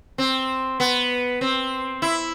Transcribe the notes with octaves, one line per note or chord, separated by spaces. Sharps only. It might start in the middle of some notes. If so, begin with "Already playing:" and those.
C4
B3
C4
E4